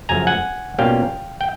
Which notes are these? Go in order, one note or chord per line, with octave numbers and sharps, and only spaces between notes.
F#2 C#3 F3 A3 G#5 A#5
F#5 G#5
B2 G3 A#3 C#4 F4 F5 G5
G5